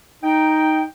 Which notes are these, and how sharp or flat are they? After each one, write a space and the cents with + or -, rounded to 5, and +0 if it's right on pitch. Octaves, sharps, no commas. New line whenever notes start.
D#4 +0 G5 +0